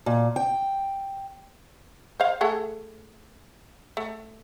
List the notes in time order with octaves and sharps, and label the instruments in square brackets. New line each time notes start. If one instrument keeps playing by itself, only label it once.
[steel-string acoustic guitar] A#2
G5
[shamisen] C5 F5
A3 G#4 A4
A3